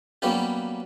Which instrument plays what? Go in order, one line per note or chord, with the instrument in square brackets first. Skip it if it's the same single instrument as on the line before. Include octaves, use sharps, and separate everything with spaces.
[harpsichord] F#3 G3 A#3 B3 C#4 G4